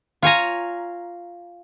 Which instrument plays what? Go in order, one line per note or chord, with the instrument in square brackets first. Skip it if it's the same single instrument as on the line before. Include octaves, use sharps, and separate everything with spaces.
[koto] F4 C#5 G#5 A#5